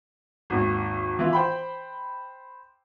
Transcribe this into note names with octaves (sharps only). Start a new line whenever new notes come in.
G#1 D#2
E3 E4 F4
C5 G5 B5